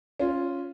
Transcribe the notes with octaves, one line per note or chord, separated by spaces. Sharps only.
C#4 F4